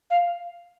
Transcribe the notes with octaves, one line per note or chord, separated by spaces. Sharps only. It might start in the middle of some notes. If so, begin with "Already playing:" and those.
F5